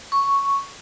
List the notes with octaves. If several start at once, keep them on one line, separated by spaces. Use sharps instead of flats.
C#6